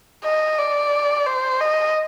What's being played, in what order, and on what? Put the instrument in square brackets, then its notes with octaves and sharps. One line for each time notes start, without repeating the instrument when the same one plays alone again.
[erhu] D#5
D5
C5
D#5